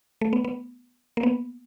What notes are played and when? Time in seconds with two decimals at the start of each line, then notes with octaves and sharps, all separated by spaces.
0.21 A3
0.33 B3
0.45 B3
1.17 A#3
1.23 B3